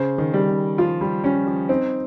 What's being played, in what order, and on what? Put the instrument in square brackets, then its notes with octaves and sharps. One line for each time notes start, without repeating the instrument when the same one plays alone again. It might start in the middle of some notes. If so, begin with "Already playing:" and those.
Already playing: [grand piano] C#3 [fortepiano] C5
[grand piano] D#3
[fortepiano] G3
[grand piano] C#3
[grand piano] F3 [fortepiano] F4
[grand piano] G3
[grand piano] G3 [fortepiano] C#4
[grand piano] F3
[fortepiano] C4 [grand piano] D#4